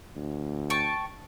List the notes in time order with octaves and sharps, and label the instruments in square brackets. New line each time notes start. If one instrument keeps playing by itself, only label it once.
[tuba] D2
[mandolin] G5 A5 C#6